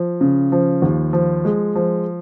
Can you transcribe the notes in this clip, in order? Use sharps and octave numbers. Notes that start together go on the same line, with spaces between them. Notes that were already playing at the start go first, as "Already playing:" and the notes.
Already playing: F3
C#3
F3
D#2
F3
G#3
F3